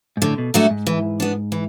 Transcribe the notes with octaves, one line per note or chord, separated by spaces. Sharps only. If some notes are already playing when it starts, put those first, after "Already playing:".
G#2
A2 D3
B2
G#2 F#3 A3 D4 F#4
G#2
E3
B3 D4
E3